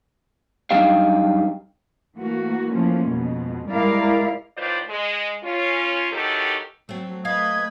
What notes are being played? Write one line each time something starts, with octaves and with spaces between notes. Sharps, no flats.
F#2 G3 D4 D#4 G4 F5
E3 A3 A#3 F#4
E3 F3 A3 A#3 C#4
F2 B2 G#3
G3 G#3 E4 A#4 D5 F5
A2 D#3 F4 B4 C5 D5
G#3
C#4 F4
D#3 E3 F#3 D#4 G4 A4
F#3 A3 C4
A3 B4 D#5 F5 G#6